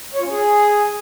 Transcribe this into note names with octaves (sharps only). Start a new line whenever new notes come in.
C#5
F4
C#4
G#4